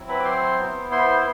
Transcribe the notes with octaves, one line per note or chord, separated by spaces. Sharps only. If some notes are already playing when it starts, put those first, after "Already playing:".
Already playing: F#3 C4 E4
B4 B5
D6
C5 C6
B3 E4
C5 C6